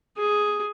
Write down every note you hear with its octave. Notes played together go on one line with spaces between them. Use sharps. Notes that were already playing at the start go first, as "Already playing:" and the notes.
G#4